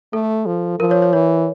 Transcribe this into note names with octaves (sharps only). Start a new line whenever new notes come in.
A3 A4
F3
F3 A#4
C#5
C#5
E3 C#5